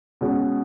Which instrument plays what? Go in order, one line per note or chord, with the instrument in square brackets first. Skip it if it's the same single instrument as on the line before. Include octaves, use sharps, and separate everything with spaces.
[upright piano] B2 G#3 C#4 F#4